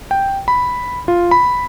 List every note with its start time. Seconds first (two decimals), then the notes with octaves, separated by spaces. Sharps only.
0.11 G5
0.48 B5
1.08 F4
1.31 B5